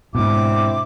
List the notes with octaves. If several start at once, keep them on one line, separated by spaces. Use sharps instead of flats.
G#2 B2 C4 D4 E4 D6